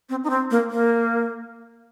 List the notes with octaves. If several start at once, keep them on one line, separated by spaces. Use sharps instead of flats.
C4
D#4
C4
A#3
A#3